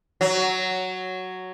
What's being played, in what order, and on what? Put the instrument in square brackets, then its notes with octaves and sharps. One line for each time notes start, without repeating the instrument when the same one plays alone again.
[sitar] F#3